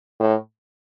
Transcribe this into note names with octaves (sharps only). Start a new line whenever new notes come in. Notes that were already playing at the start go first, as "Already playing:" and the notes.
A2